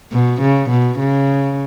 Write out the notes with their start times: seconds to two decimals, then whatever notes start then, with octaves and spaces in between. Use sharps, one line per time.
0.12 B2
0.41 C#3
0.70 B2
0.99 C#3